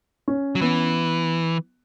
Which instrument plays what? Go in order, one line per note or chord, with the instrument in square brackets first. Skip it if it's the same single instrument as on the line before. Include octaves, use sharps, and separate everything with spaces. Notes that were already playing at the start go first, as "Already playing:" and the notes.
[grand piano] C#4
[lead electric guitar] F#3
[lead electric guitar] E3 [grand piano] B3